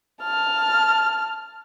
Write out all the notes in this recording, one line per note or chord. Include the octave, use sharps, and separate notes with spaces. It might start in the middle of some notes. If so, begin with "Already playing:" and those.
A5 F6